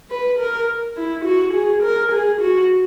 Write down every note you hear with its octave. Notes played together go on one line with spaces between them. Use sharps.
B4
A#4
E4
F#4
G#4
A#4
G#4
F#4